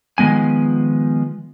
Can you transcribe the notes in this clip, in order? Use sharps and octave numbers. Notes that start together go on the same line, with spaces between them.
D#3 F3 G#3 B3 G#5